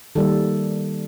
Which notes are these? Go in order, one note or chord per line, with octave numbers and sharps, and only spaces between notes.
D#3 G3 A#3 A4